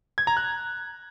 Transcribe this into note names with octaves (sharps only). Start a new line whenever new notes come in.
G#6
A#5
F#6